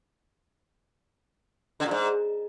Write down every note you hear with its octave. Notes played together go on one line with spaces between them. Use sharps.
D3
A#2
G#2